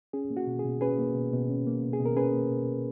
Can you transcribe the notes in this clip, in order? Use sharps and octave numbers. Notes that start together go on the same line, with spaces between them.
C#4 G#4
A#3
F#4
B2
G#4
B2
C#4 G#4 B4
A#3
B2
B2
C#4
A#3
B2
G#4
B2
A#4
C#4 G#4 B4
A#3
B2
B2